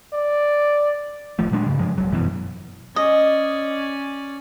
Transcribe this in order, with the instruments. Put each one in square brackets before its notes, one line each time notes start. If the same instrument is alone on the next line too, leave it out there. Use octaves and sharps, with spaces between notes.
[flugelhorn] D5
[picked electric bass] D1 D#2 F3 A3
A#2 F#3 G#3 D4
G2 C#3
G2 F3 G#3
D#1 E2 F#3
G1 F#2 B2 E3
[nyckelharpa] C#4 D5 [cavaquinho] D#5